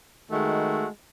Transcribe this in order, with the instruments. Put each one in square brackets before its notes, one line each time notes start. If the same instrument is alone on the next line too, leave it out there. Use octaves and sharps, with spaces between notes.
[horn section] D#3 G#3 A3 F#4